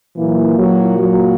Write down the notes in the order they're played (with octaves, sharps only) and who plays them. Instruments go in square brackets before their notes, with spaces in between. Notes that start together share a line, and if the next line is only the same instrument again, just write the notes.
[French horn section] A#2 E3 F#3 A#3 E4
F#3 F#4
F#3 F#4